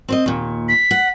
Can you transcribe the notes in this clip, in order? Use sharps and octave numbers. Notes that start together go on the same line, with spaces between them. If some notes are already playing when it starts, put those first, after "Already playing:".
C4 C5 D#5
D#2 A#2
B6
F#5